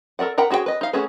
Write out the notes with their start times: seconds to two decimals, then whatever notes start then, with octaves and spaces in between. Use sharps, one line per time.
0.19 A4 A#4 D5 F#5
0.38 A#4 F#5 G5 A#5 B5
0.50 C#4 F#4 G#4 B4 G5
0.66 B4 D#5
0.81 D#4 F5
0.93 A3 C#4 F#4 G#4 B4